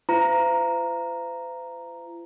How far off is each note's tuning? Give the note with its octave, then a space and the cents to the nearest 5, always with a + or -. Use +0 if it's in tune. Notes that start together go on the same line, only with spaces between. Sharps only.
F4 -45 C5 -45 A#5 +0